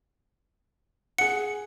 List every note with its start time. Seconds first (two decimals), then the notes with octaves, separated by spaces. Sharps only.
1.18 G#4 F#5 C#7